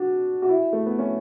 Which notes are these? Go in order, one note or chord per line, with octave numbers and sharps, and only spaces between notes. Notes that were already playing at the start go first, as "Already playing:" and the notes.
Already playing: D4 F#4
F#4
E4
A3
B3
C#4